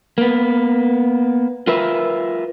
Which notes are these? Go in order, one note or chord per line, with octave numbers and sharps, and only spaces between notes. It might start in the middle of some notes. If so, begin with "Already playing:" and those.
A#3 B3
F4 A#4 B4 E5